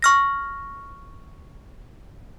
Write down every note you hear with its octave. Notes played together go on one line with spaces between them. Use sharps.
C#6 F6 A#6